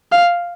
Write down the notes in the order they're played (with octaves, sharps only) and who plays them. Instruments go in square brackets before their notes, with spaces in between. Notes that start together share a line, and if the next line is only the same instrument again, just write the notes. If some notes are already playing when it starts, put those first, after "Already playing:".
[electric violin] F5